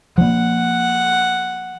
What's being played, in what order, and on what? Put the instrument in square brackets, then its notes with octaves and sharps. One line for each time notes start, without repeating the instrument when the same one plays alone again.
[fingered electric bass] F3 A#3 [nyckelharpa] F#5